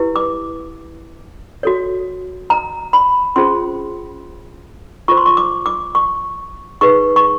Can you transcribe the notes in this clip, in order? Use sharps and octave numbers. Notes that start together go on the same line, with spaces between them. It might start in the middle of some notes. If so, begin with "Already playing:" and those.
Already playing: E4 G4 B4
D6
F#4 A4 C#5
A#5
B5
C#4 F4 G#4 C5 C6
F4 A4 C5 C#6
C6
C#6
D6
D6
C#6
D#4 G#4 B4 C#6
C#6